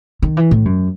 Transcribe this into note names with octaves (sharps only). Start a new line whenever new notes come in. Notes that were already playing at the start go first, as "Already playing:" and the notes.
D#3
E3
A2
F#2